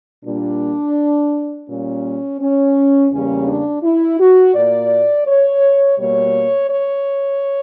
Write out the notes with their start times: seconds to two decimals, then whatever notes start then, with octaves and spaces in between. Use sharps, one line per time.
0.25 A#2 G3 A#3 D4
1.68 A#2 G3 A#3 C#4
2.40 C#4
3.11 E2 C#3 G3 A#3 C#4
3.48 D4
3.83 E4
4.20 F#4
4.55 A#2 A#3 D5
5.27 C#5
5.98 B2 G3 A#3 C#5
6.70 C#5